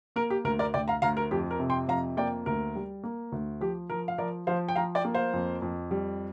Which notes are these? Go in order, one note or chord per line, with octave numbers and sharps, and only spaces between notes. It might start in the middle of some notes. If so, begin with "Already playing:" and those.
A#3 A#4
G4
D2 A#4
A#4 D5
D2 D5 G5
F5 A#5
D2 F5 A#5
A#4
F2 G4
A#4
C3
G5 C6
F2 F5 A#5
A#3 D5 G5
D2 A#4
G3
A#3
D2
F3 G4
F3 A#4
F5
F3 A#4 D5
F3 C5 F5
G5
F3 F5 A#5
D5 G5
A#3
C5 F5
F2
F2
G3